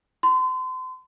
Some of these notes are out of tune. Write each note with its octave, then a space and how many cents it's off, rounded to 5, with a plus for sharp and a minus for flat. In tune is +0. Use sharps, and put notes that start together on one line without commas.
C6 -35